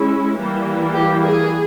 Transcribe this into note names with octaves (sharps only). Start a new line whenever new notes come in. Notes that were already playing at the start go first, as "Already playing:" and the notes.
Already playing: G#3 C#4 E4
E3 G3 A#3
G4
G#4